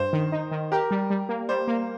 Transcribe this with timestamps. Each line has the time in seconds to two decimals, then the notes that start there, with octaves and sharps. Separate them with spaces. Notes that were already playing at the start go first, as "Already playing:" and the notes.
Already playing: G2 C5
0.13 D#3
0.32 D#4
0.51 D#3
0.72 G4 A#4
0.91 G3
1.10 G3
1.29 A#3
1.49 G3 C5
1.68 A#3